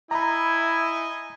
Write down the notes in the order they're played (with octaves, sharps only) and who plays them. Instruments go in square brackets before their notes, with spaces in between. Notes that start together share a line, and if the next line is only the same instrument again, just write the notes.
[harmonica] D#4 D#5 G#5 [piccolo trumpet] E4 [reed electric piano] A#5 B5